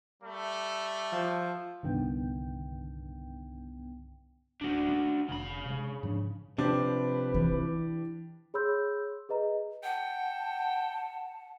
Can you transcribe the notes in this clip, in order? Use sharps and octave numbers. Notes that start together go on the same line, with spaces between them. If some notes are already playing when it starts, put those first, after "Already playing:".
G3 A3
F3
C2 G2 D3 D#3 B3 G5
D1 A3 D4 F#4
A3 C#4
F1 C#3 B5
C3 G#3
G#2 F3 D4
C3 F3 D4 G4 B4
E3
G#4 C#5 B5 C6 E6 G6
G#4 B4 D#5 A#5
F#5 G5 A5